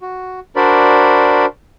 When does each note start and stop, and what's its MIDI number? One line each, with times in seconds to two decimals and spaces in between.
0.01 0.40 66
0.56 1.46 62
0.56 1.46 66
0.56 1.46 70
0.56 1.46 72
0.56 1.46 74
0.56 1.46 83